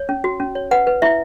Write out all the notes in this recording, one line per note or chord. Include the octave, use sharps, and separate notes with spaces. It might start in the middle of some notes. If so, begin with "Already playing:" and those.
Already playing: C#5
C#4
F#4
C#4
C#5
B4 F#5
B4
E4 E5